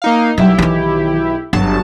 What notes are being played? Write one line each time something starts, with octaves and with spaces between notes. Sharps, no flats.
A#3 D#4 F5
B1 F#3 G3 E4 G4
D#3 E3
G1 F#3 A5